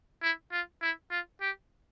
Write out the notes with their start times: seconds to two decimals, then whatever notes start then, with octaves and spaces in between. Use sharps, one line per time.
0.22 E4
0.52 F4
0.82 E4
1.11 F4
1.41 G4